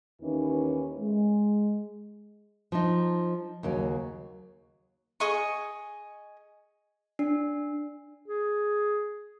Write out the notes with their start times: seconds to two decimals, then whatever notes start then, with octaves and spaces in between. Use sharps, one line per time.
0.22 D#2 D#3 E3 C#4 D#4 B4
0.99 G#3
2.72 F3 D#4
3.63 D#2 C#3 F#3
5.20 G#4 D#5 C#6
7.19 D4
8.26 G#4